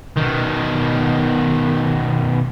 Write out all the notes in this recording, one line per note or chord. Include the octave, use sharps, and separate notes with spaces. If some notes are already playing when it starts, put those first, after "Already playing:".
B2 D#3